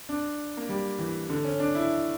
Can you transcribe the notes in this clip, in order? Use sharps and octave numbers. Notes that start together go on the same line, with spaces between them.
D4
A#3
G3
E3
D3
C#4
D4
E4